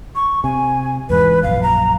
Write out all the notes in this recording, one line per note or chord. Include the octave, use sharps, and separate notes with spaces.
C#6
C3 G#5
E2 G#2 E3 B4
A#1 F#2 F5
A#5